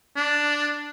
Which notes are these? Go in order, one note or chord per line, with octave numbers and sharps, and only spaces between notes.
D4